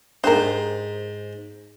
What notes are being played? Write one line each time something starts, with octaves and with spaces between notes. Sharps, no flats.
G#2 D4 G4 A#4 C5